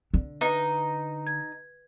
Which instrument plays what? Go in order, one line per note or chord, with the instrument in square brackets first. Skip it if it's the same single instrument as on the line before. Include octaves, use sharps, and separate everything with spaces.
[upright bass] D3
[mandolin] D#4 [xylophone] B4
[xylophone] G#6